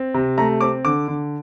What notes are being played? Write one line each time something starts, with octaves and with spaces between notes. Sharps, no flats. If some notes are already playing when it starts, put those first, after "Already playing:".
Already playing: C4
C3
A3 A#5
C4 D6
D3 D6
D3